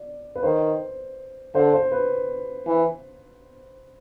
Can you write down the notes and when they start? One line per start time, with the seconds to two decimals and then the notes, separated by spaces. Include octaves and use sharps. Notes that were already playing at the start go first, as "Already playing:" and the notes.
Already playing: D5
0.35 B4
0.43 D#3 C5
1.54 D3 C5
1.73 C5
1.91 B4
2.67 E3